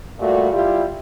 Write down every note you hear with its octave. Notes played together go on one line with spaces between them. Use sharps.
A#2 G3 A3 F#4
G3 E4 F4 G4